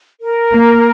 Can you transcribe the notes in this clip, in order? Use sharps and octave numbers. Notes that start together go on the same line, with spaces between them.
A#4
A#3